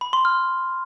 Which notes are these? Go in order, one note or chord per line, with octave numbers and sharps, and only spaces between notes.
B5
C6
F6